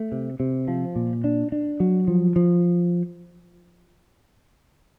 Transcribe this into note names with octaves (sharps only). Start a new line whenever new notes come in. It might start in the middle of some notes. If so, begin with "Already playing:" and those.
Already playing: A3
C3
C3
F3
A#2
D4
D4
F#3
F3
F3